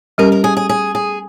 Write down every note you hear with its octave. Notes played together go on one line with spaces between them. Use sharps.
G3 C#4 G4 A#4
A#4
G#4
G#4
G#4
G#4